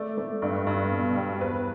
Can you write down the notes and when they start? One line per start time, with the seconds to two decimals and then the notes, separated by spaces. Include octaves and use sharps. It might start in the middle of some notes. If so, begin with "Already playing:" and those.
Already playing: A3 D5
0.18 A3
0.42 G2
0.67 G2
0.91 B2
1.16 G3
1.41 E2 B4